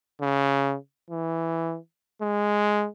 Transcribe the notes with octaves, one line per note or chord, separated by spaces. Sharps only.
C#3
E3
G#3